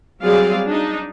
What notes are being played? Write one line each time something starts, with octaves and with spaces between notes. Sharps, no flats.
F#3 G3 C4 G#4 D5 F5
D4 D#4